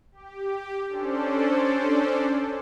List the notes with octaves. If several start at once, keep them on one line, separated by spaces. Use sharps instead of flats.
G4
C#4 D4 A4 C5 D5